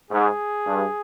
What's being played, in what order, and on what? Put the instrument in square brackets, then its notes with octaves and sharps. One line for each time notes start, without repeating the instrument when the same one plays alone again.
[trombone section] G#2 [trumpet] G#4
[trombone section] G2